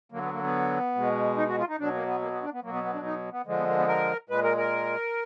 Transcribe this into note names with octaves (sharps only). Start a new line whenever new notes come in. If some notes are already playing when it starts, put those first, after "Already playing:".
D3 F#3 A#3
B3
A#3
B3
B2 G#3
D#4
F#4
F4
D#4
B2 F#3 D4
A#3
B3
A#3
B3
D4
B3
B2 F#3 A#3
B3
B3
D4
D#4
B3
D3 F3 G#3
B3
A#3
B3
A#4
A#2 G#3 B4
A#4
A#4